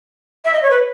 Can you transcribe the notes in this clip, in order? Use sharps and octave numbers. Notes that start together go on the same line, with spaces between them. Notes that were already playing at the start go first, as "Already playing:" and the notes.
E5
D#5
C#5
B4